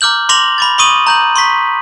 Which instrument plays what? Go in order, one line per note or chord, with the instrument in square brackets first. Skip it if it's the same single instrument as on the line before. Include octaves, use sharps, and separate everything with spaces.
[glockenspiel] A#5 D6 F6 G6 F#7
C6 D6 A#6 F7 F#7
B5 D6 A6
B5 C#6 D#6 D#7 F#7
A#5 G6 F#7
C6 C#6 B6